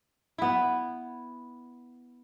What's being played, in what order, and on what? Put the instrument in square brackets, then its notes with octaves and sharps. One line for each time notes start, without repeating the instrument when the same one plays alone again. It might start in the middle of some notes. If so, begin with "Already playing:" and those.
[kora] B3 E4